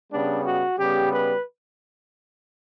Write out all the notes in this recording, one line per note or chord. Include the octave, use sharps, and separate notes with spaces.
C#3 G3 B3 D4
F#4
C#3 G3 B3 G4
B4